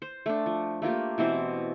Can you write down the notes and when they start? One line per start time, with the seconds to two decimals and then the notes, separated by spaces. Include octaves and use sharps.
0.02 C5
0.26 A3 D4
0.46 F3
0.82 A3 A#3 F4 G4
1.18 B2 E3 C4 C5